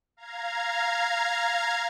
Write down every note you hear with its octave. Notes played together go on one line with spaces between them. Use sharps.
F5 A#5 G#6